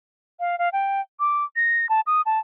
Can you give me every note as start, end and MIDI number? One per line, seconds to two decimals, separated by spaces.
0.40 0.58 77
0.58 0.69 77
0.73 1.01 79
1.20 1.44 86
1.56 1.88 94
1.89 2.01 81
2.07 2.21 87
2.26 2.39 81